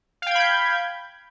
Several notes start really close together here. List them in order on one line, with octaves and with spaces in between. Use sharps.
F5 G5 G#6 B5 G6